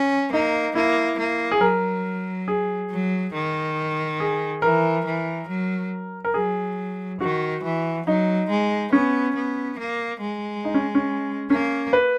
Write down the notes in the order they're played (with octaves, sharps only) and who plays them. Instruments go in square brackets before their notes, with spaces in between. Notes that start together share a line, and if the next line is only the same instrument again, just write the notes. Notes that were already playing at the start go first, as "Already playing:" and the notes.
Already playing: [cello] C#4
[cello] A#3 [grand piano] D#4
[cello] A#3 [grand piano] E4
[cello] A#3
[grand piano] G#4
[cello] F#3 [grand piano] A#4
[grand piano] G#4
[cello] F#3
D#3
[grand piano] G#4
[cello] E3 [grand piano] A#4
[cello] E3
F#3
[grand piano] A#4
[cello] F#3 [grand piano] G#4
[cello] D#3 [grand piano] F#4
[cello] E3
[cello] F#3 [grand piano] D#4
[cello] G#3
[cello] B3 [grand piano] C#4
[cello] B3
A#3
G#3
[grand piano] D#4
C#4
C#4
[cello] A#3 [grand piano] C#4
[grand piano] B4